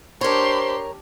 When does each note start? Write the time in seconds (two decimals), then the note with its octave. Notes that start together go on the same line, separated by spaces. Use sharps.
0.21 D4 G4 A#4 C5 C#5 C6